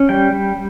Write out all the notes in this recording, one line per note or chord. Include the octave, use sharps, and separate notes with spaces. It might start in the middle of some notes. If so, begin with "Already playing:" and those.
Already playing: C#4
G3 G5
G3